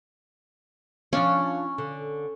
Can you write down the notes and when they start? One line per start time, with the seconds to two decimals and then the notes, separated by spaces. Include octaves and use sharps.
1.13 F3 C#4 D4 F5
1.78 D3